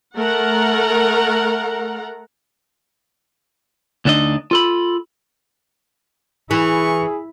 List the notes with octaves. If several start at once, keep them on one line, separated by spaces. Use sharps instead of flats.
A3 A#4 F#5 A#5
D2 D3 D4 D#4 D#5
F4 A4 B5
E3 E4 G#4 C#6